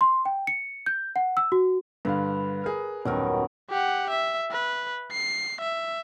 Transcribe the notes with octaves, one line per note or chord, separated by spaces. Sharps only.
C6
G5
C#7
G6
F#5
E6
F#4
G2 D3 B4 F5
G#4 A#4
D#1 F#2 B2 D#3 A#4
G4 F#5
E5
B4
C7
E5